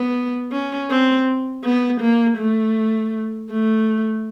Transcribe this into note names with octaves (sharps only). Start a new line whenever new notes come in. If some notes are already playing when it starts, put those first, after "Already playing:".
Already playing: B3
C#4
C4
B3
A#3
A3
A3